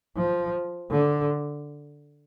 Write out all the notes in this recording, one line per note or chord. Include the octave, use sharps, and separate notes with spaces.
F3
D3